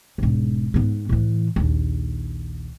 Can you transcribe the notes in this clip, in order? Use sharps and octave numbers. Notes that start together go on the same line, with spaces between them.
E1 G#2
G#2 B3
A2 E3
A#1 D#2